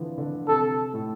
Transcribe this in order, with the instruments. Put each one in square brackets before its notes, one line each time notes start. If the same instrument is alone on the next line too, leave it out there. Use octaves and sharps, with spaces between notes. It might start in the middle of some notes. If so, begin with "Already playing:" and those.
Already playing: [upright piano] D3 E3 F3
D3
[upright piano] C3 [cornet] A4
[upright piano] A2